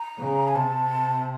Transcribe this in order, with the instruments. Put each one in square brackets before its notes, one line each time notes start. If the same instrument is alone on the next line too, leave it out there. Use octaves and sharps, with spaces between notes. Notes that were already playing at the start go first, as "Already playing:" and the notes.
Already playing: [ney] A#5
[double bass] C#3
[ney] G#5
[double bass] C3 [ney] A5